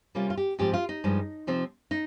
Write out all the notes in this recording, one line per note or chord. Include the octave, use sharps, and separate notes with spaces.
C3 G3 A#3 C#4 F4
F4
G4
G#2 F3 C4 G4
F4
D#4
G2 F3 G#3
C3 F3 C4
D#4